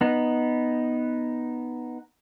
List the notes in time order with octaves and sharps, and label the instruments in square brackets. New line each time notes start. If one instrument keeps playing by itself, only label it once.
[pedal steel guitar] B3 D#4